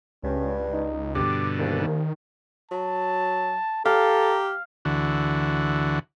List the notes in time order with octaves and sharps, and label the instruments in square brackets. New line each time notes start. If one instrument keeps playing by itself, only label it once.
[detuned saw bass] C#2 [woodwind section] G2 [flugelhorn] C#4
[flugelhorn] D#4
[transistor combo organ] G2 B2 D3 [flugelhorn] G4 [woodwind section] D6
[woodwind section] C2 [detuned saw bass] D#3 [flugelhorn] A#3
[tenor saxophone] F#3 [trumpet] A5
[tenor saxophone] G4 [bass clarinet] A4 [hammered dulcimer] F5 [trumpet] A#5
[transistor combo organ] D2 D3 E3 F#4